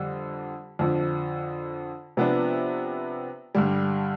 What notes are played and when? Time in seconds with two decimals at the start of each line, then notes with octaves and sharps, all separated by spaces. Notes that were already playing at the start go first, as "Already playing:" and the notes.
Already playing: F2 D3 G3
0.79 F2 D3 F3
2.17 C3 F3 B3 D4
3.55 G2 D3 G3